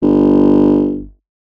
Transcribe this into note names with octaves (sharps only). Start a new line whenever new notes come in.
G1